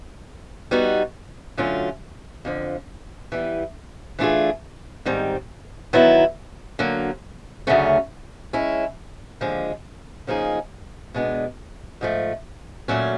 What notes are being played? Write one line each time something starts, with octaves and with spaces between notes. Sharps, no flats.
G3 B3 D#4 F#4
D3 F#3 A3 C#4 F4
F2 D3 F3
E3 G3 B3
E3 A3 D4 F4 G#4
G#2 D#3 G3 C4
D#3 F#3 B3 E4
D3 F#3 A#3
D2 C#3 F#3 A3 C#4
G#3 C#4 E4
D#2 D3 F3 G#3
C#3 F3 A#3 D#4 G#4
B2 G#3 B3 D4
G#2 F3 A3
A#2 F#3 A3 C#4